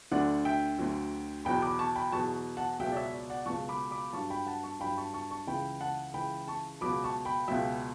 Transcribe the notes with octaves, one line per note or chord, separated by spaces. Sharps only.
D2 D3 F#3 D5 F#5
E5 G5
D2 D3 F#3
E2 B2 F#3 G5 B5
B5 D6
A5 C#6
G5 B5
E2 B2 F#3 A5 C#6
F#5 A5
C#2 B2 F#3 E5 G5
D5
C#5 E5
D5
D5 F#5
C#2 B2 F#3 A5 C#6
B5 D6
B5 D6
G2 F#3 A5 C#6
G5 B5
F#5 A5
A5 C#6
G2 F#3 G5 B5
A5 C#6
A5 C#6
A5 C#6
C#2 C#3 E3 G5 B5
F#5 A5
C#2 C#3 E3 G5 B5
A5 C#6
C#2 B2 F#3 B5 D6
A5 C#6
G5 B5
C#2 B2 F#3 E5 G5